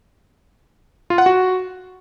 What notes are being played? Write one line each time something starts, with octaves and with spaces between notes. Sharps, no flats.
F4
F#5
F#4